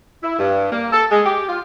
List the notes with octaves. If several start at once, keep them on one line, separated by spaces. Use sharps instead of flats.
E4
G2
A#3
A4
G#3
G4
F4